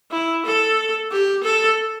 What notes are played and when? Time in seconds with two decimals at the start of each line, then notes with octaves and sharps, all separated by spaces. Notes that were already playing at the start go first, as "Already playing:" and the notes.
0.11 E4
0.45 A4
1.11 G4
1.43 A4